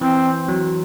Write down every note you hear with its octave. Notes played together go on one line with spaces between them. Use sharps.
E3 C4
F#3